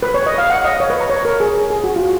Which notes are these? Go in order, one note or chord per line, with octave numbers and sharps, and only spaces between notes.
B4
C#5
D#5
F5
F#5
D#5
C#5
B4
A#5
C#5
A#4
G#4
G#4
F#4
F4